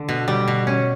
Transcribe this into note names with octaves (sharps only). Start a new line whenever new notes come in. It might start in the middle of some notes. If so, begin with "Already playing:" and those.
Already playing: D3
B2
G3
B2
C#4